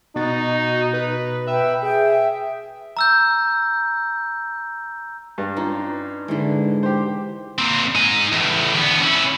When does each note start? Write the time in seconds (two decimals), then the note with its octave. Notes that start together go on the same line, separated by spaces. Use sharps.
0.16 B2 D#4 F#4 A6
0.93 B4
1.47 B4 E5 G5
1.83 G#4 G5
2.97 A#5 E6 G6
5.38 G2
5.56 C#4 D#4 F4
6.28 G#2 D3 E3
6.83 G4 C5
7.58 A#3 C4
7.95 D#4 G#5
8.33 E2 A2
8.75 D2 B3
9.02 C#4 E4